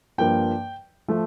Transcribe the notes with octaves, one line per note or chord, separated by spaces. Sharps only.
G2 F3 A#3 G5
F3 A3